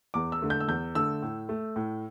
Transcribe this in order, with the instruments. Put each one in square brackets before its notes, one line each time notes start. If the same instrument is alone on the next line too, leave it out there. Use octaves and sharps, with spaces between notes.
[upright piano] E2 D6
E6
D3 A3
G6
E6
E2 G6
D3 A3 E6
A2
A3
A2